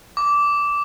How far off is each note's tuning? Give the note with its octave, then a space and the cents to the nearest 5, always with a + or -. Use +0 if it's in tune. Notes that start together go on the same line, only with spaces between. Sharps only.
D6 -15